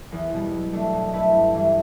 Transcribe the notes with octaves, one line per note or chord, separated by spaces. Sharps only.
E2
B2 G3
F#3
A3 D4
B2
A3 E4 B4
G2
E3 G3 D4